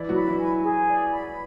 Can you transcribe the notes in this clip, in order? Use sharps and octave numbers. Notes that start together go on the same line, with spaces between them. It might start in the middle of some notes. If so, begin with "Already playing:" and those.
Already playing: E3 E4 D5
F#3 F#4
B5
E3 E4
G#5
G#4
D5
B5